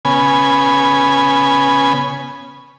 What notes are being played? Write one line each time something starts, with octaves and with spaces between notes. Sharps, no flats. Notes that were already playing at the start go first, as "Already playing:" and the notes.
C#3 B3 G#5